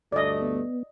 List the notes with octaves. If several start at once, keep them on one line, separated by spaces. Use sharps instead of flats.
D2 G2 A3 D5 D#5
B3